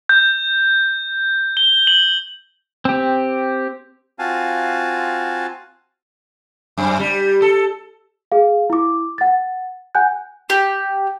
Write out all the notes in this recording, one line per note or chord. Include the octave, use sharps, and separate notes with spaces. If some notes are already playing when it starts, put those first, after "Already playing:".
G6
G7
F#7
C4 G4
C4 F4 F#4 F5 G#5 A5
F#2
G3
A4
G#4 F5
E4 D6
F#5 A6
F#5 G#5 F#6 G6
G4